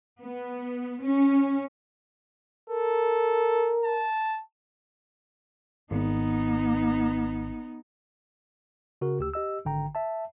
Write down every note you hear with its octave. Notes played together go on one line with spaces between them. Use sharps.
B3
C#4
A4 A#4
A5
G#1 B3 D#4
C#3 F#4 A#4
D2 G4 E6
G4 D#5 E6
G#1 D3 G5 A#5
E5 A5